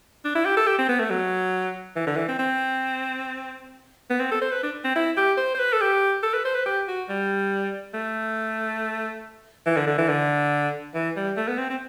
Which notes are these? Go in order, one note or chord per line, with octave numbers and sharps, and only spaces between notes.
D4
E4
G4
A4
G4
C4
B3
A3
F#3
E3
D3
E3
C4
C4
B3
C4
A4
C5
B4
D4
C4
E4
G4
C5
C5
B4
A4
G4
A4
B4
C5
B4
G4
F#4
G3
A3
E3
D3
D3
E3
D3
E3
G3
A3
B3
C4
C4